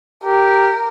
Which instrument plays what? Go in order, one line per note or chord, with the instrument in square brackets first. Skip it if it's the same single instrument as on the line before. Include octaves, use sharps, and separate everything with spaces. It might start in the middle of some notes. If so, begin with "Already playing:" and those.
[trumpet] G4 [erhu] A#4